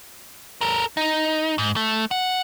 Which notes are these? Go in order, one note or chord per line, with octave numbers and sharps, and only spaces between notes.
A4 A#4
D#4
G#2
A3
F#5